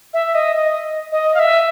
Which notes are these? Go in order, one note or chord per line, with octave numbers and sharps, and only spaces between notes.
E5
D#5
D#5
D#5
F5
E5